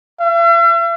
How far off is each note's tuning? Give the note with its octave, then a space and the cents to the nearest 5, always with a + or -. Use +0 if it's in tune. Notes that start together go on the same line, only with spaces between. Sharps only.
E5 +45